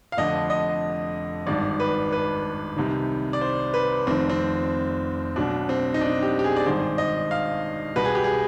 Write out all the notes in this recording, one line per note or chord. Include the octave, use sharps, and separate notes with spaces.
F5
F1 F2 D3 D#5
D#5
G#1 G2 D#3 D5
B4
B4
C2 C3 D#3
D5
C5
B4
F1 F2 D#3 C4
C4
B1 B2 D4
C4
D#4
D4
G4
G4
G#4
D5
G#1 G2 D#3 C5
D#5
F5
C2 B2 B4
G#4
G4
G#4